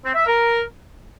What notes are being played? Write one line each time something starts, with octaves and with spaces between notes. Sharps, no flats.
C4
E5
A#4